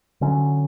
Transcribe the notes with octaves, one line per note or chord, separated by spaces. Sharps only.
D3 F#3 C#4